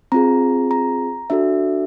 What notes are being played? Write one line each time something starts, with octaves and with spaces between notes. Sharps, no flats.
C4 F4 G#4 A#5
A#5
D4 F#4 A4 E5